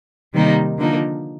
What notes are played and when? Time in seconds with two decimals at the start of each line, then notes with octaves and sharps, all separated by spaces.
0.34 C3 D#3 G3 A#3 D#4
0.79 D3 F3 A#3 D#4